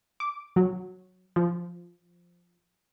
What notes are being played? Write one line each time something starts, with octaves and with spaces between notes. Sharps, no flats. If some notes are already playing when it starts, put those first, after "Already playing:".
D6
F#3
F3